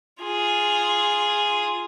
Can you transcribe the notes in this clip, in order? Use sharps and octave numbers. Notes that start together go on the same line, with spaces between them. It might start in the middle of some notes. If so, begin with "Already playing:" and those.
F4 G#4